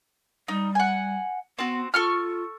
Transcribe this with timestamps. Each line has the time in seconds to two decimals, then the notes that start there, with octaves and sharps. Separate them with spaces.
0.48 G3 D#4
0.75 F#5 G#5
1.59 B3 C4 F#4
1.94 F4 A4 C#6 F6